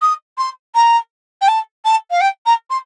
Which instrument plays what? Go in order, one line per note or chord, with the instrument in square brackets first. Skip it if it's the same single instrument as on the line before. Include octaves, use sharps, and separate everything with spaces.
[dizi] D#6
C6
A#5
G5
A5
A5
F5
G5
A#5
C6